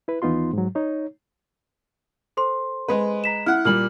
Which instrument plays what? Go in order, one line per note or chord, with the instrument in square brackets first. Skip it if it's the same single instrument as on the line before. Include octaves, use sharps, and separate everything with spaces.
[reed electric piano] E4 B4
D#2 E3 B3 D#4 F4 C6
G#2 F#3
D#4 C#5
[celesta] A4 C5 C6
[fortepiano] G#3 B4
[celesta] A#5 B6 E7
[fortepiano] E4 F#5 [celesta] F6
[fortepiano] A#2 G3 [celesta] F6 F#7